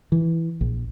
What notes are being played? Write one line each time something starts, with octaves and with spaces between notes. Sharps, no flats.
E3
A#1